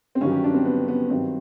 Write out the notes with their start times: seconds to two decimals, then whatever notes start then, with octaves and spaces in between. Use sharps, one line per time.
0.15 C4
0.21 G2 D#3 F#3 C#4
0.32 G4
0.44 D4
0.54 C4
0.65 B3
0.88 B3
1.10 G2 D#3 F#3 C4